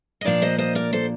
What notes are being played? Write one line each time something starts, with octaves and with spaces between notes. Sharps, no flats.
D#5
A#2 F3 A#3 D4 D5 F5
C5 D#5
C5 D#5
A#4 D5
A4 C5